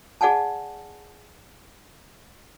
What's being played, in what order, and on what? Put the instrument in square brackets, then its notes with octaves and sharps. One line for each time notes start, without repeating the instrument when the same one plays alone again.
[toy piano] G#4 D5 F#5 G#5 A5